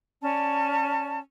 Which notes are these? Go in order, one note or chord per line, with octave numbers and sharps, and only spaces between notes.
C#4 D5 A5